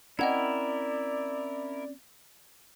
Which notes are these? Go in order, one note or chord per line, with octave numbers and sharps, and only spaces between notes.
C4 C#4 E4 A#4 D5 D#5 F#5 G#6